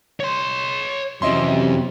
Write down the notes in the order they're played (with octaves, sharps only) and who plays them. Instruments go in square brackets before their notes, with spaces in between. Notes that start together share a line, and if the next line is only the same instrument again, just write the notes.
[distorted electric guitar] C#5 C6
[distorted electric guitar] F2 [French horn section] C3 [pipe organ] E3 F#3 C#4 [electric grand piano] D#5 E5 C6